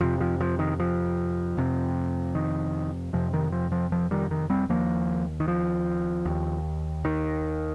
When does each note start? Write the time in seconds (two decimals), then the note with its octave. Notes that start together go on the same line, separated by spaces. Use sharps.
0.01 F2 C3 F3
0.21 F3
0.41 F3
0.59 D#3
0.80 F3
1.57 F2 C3
2.35 D#3
3.13 F2 C3 F3
3.34 D#3
3.52 F3
3.72 F3
3.92 F3
4.11 D#3 G3
4.31 D#3
4.50 G3 C4
4.69 D#2 F3 A#3
5.40 D#3
5.48 F3
6.25 D#2
7.05 D#3